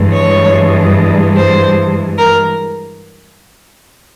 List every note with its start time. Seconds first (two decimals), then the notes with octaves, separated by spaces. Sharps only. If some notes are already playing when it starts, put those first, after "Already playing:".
Already playing: G2 E3 G#3
0.12 C#5
1.36 C5
2.18 A#4